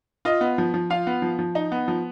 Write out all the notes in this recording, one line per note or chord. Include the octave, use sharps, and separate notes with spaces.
F4 D#5
B3
F3
F3
F4 F5
B3
F3
F3
D#4
B3
F3